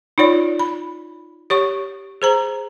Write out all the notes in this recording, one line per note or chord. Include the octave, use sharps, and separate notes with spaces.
D#4 F4 C#5 D5
B5
G4 C#5 C#6
G#4 C5 A#5